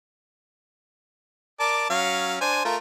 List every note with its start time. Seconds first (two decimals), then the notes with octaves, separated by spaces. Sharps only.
1.60 A#4 D5 A5
1.90 F#3 C#4 F5
2.41 D4 C5 G#5
2.65 A3 F4 A#4